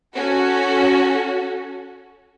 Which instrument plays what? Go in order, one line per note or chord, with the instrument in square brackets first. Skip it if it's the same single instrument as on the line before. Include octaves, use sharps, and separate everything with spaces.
[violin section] C#4 F#4 A4